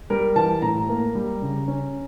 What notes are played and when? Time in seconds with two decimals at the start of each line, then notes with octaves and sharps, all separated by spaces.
0.10 G3 A#4
0.36 E3 A5
0.62 A2 A#5
0.89 A#3
1.15 G3
1.42 C#3
1.68 C#4